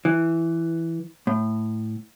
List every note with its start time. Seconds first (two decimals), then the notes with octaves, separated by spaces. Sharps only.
0.05 E3
1.27 A2